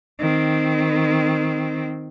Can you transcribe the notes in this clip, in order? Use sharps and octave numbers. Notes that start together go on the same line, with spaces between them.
D#3 C4